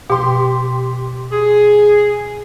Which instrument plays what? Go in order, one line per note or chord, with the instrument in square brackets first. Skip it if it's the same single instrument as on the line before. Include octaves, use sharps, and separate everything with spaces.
[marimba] B2 [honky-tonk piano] G4 C6
[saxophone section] G#4